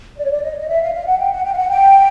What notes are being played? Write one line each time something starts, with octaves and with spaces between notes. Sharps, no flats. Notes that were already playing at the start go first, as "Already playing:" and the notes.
D5
C#5
D5
D#5
D#5
E5
F5
F5
F#5
G5
F#5
G5
F5
F#5
G5